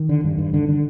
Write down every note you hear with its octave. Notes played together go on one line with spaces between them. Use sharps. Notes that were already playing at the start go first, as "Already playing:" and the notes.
Already playing: D#3
D3
G2
G2
D3
D3